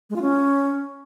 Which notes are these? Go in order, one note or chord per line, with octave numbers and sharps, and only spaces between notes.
G#3
F4
C#4